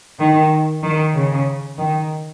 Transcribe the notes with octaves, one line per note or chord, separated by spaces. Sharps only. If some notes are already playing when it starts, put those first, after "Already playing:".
D#3
D#3
C#3
D#3